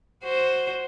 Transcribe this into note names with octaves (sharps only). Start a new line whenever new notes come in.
F#4 C5